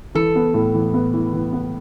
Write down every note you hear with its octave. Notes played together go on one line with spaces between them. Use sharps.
E3 A4
B3
A2
E3
B3
E3
E3
B3